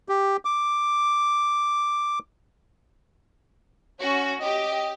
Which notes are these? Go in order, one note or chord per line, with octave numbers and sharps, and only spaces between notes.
G4
D6
C#4 F#4
G4 D#5